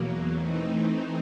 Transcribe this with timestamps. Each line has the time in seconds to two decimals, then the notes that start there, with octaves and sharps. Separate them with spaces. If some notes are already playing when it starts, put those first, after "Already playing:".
Already playing: E2 B2 F#3 A#3
0.33 E3 A3 C4 D#4